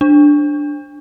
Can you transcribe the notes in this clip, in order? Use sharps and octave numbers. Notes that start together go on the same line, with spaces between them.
D4